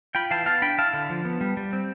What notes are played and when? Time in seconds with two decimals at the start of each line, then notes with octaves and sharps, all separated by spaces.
0.15 F4 G5 B5
0.31 E3 F5 A5
0.46 B3 F5 A5
0.62 D4 G5 B5
0.78 E4 F5 A5
0.93 D3
1.10 F3
1.25 B3
1.41 G3
1.57 G3
1.73 C4